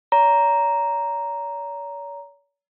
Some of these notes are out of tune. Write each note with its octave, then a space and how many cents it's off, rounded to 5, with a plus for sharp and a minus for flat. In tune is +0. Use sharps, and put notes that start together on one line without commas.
C#5 +45 A#5 +0